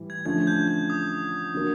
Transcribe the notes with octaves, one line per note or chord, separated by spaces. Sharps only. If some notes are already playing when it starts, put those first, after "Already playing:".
Already playing: A2 E3 G3
G#6
D3 F3 A3 C#4 G#6
G6
G6
D#6
D3 F#3 A#3